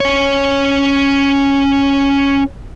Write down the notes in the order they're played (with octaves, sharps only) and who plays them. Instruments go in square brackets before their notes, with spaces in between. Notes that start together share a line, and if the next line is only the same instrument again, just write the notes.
[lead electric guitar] C#4 C#5